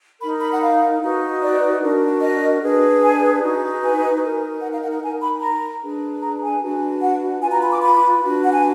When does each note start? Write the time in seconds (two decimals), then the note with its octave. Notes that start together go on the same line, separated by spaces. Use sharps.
0.20 D#4 A#4 B5
0.40 B5
0.51 F#5
0.61 F5
1.01 D#4 F#4 B4
1.41 D5
1.81 D4 F#4 A#4
2.21 D#5
2.61 D4 G#4 B4
3.02 G#5
3.41 D#4 F#4 B4
3.82 G#5
4.22 D#4 A#4
4.62 F#5
4.72 F5
4.82 F#5
4.92 F#5
5.02 D#4 A#4 G#5
5.22 B5
5.41 A#5
5.82 D4 G#4 B4
6.22 A#5
6.42 G#5
6.62 D4 F#4 B4
7.02 F#5
7.42 F4 B4 G#5
7.52 A#5
7.62 B5
7.72 D6
7.82 B5
8.23 D4 F#4 B4
8.44 F#5
8.54 G#5